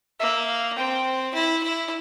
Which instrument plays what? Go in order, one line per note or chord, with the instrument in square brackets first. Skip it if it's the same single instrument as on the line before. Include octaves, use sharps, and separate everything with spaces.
[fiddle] A#3 [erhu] E5
[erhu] F5
[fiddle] C4 [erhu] G5
[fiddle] E4
E4